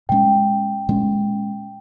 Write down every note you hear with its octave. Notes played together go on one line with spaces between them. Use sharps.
A#2 G#3 C#4 G5
A#2 G#3 C#4